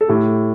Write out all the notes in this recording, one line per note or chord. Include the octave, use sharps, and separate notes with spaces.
A4
A2 G4